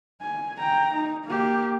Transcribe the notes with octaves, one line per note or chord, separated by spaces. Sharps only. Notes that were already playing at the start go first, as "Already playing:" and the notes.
G#5
G5 A#5
D#4
A#3 G4